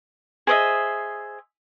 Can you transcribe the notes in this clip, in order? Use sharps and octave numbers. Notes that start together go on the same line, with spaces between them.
G#4 C5 D#5 E5